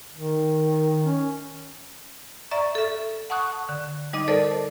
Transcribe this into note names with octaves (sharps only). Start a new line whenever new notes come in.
D#3
C#4
D5 E5 A#5 C#6 A6
A4 E5
F#5 A5 C#6 D#6 F#6
D3
G3 D#4 D#5 D6
A4 A#4 C5 D5 D#5 A5